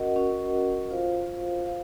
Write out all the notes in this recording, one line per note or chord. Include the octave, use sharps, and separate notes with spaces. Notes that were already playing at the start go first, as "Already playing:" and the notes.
Already playing: C#4 F#4 A#4 D#5 F#5
C#4 F#4 A#4 D#5 F#5
F4 C5 F5
C5 F5